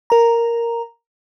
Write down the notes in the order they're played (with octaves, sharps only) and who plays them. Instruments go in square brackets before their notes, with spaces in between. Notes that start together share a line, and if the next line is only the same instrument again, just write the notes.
[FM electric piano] A#4 A#5